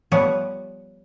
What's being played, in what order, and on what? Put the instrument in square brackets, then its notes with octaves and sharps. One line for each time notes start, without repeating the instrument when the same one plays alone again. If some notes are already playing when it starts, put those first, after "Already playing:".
[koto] F3 G3 B3 B4 C#5 F#5